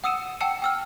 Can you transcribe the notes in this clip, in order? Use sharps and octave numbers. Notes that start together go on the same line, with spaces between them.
F#5 D#6 E6 C#7 D#7 E7
F#5 G5 A5 E6 C#7 E7
G5 E6 F6